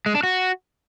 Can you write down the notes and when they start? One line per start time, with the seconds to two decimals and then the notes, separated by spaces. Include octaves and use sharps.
0.06 G#3
0.15 D4
0.23 F#4